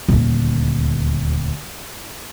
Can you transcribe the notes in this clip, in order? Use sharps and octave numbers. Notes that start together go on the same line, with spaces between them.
D#1 D2